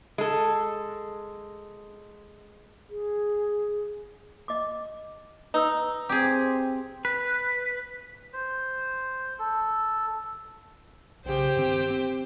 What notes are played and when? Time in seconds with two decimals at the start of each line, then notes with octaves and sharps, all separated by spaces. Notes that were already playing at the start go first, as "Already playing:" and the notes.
0.18 G#3 A4
2.89 G#4
4.48 D#5 D6
5.54 D#4 B4 E6
6.09 C4 G4 G#4
7.05 B4
8.33 C5
9.39 A4
11.25 B1 C#3 G4 C5
11.56 G2 D#3 C4
11.90 C4